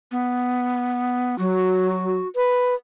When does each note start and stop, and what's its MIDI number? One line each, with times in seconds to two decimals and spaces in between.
0.11 1.38 59
1.38 2.17 54
1.38 2.28 66
2.36 2.75 71